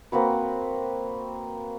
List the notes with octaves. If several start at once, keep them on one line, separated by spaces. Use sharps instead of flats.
A#3 C4 F#4 B4